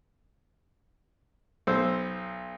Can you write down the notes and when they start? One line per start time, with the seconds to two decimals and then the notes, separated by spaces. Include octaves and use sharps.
1.67 B1 C5 E6